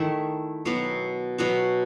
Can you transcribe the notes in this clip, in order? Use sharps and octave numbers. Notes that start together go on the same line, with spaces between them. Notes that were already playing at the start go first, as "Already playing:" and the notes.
Already playing: D#3 A3 E4
B2 F#3 B3 F#4
B2 F#3 B3 F#4